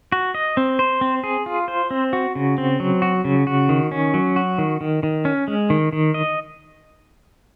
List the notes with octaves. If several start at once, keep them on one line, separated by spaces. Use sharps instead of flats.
F#4
D#5
C4
C5
C4
G#4
F4
C5
C4
F#4
C#3
C4
F#3
F#4
C#3
F#4
D#3
C#4
F#3
F#4
D#3
D#3
D#3
C#4
G#3
D#3
D#3
D#5